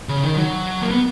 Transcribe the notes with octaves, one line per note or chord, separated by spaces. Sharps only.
C#3
D#3
F#3
A#3
B3